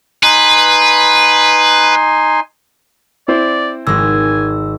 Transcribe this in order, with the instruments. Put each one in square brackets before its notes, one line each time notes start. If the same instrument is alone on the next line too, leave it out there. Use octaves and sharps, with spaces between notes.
[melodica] D#4 G#5 C6 [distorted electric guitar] B4
[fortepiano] C4 E4 C5 [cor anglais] D5
[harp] G#1 G#3 [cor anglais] G#5 [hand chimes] E6